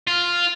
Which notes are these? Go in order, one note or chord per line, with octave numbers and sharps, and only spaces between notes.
F4